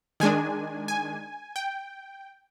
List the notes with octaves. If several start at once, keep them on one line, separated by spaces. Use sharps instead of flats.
D#3 G#3 D4 G#5
G#5
G5